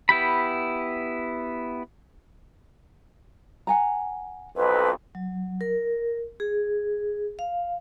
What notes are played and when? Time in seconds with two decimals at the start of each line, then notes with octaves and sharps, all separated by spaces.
0.09 B3 E4 G4 B5
3.67 F#5 G#5 A#5
4.56 B1 F2 B4
5.15 F#3
5.61 A#4
6.40 G#4
7.39 F5